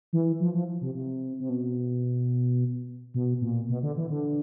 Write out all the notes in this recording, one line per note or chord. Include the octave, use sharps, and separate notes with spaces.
E3
F3
F3
C3
C3
C3
B2
B2
A#2
B2
D3
E3
D3